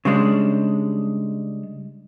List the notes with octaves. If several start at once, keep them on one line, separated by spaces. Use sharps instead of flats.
C#3 G3 G#3 D4